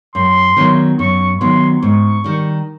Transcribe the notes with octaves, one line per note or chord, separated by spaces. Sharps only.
F#2 C6
D#3 F#3 B3
F#2 C#6
D#3 F#3 B3 C6
G#2 C#6
D#3 G3